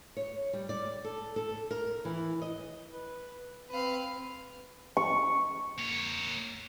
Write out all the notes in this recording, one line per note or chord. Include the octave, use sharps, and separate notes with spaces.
C#5
G3
D5
A4
A4
A#4
E3
D#5
B4
C4 B4 F5
C#6
A#3 C#5